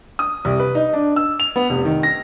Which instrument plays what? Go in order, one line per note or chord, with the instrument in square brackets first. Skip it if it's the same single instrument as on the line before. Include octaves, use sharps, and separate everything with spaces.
[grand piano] D#6
C2
B4
D#4
D4
E6
F7
B3
F1
D#3
A#6